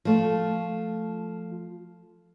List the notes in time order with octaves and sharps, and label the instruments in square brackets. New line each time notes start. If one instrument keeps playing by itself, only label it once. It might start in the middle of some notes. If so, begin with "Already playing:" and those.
[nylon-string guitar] F3 A3